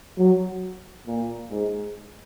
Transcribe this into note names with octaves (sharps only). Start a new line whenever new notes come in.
F#3
A#2
G#2